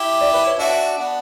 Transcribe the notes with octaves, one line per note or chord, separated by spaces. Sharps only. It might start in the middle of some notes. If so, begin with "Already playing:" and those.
Already playing: E4 G4
D5
B4
C#5
D4 F#4 E5
B3 D4